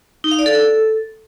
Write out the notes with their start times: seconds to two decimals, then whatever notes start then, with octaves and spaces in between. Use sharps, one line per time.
0.24 D#4
0.31 F5
0.39 D5
0.46 A4